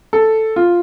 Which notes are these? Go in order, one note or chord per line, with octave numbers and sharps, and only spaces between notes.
A4
F4